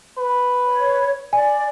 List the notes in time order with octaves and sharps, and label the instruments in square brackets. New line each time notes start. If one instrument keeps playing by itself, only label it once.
[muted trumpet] B4
[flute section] C#5
[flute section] D5 [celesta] G#5